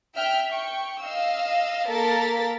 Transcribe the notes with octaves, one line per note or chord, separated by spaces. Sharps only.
E5 G5 F6
G5 C#6
D#5 F5 E6
A#3 A4 A#4 A6 B6